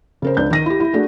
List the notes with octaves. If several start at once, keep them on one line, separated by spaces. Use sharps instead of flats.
C#3 A#4 C5
C#2 D4 G6
D#3 A#6 D#7
E4 G4
E4
A3 D4 F#4 G#4